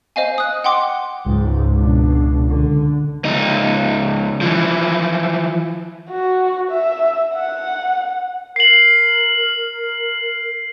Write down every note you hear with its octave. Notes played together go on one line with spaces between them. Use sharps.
C5 D#5 F5 G#5
D#6 F#6
F#5 G5 C6 D6
C#2 G#2
B2 D4
D3
C#2 D#4
E3 F3
F#4
E5
F#5
A#4 C7 F#7